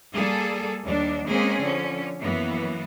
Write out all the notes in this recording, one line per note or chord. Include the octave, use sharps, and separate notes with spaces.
G3 A#3 G#4 A4
D#2 G3 D4
G#3 A#3 C4 C#4 G#4
D3 F3 C#4
F#2 E3 A#3 B3